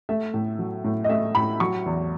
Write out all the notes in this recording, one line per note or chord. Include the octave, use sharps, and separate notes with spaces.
A3 E5
A2
F#3
A2
D#5
A3 E5
A2 B5
F#3 C#6
E2